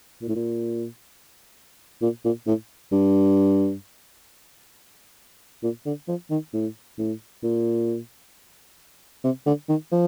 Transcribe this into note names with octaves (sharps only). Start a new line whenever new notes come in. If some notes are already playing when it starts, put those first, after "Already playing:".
A#2
A2
A#2
A#2
A#2
A2
G2
A#2
D3
F3
D#3
A2
A2
A#2
C3
D3
D#3
F3